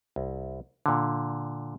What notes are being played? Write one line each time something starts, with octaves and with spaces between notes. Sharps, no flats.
C2
A#2 D3